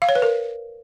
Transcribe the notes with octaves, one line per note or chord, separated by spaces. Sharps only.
F5
C#5
B4
A#4